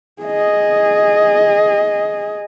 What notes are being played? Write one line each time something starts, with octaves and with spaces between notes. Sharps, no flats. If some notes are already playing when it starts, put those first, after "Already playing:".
G#4 D#5